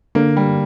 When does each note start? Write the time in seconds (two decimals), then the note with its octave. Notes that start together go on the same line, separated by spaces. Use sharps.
0.15 D3 A#3
0.37 G3